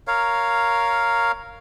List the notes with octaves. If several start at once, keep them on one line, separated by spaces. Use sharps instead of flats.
A#4 C#5 F5